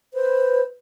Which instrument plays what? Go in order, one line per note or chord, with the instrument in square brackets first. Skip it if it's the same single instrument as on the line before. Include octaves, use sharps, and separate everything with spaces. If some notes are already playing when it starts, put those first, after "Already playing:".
[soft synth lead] B4 [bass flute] C5